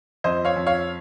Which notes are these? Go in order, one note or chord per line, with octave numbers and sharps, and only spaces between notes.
F2 C5 D#5
C#5 F5
F2
C#5 F5